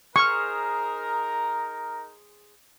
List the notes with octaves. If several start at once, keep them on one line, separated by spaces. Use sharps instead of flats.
D#4 G#4 A#4 C5 C#6 F6